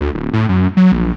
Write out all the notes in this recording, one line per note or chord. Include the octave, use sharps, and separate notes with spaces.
D2
D1
A2
F#2
F#3
A#1